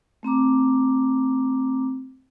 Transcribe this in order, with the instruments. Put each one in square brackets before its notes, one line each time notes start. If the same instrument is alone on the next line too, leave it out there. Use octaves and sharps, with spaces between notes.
[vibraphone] A3 C4 A#5 D6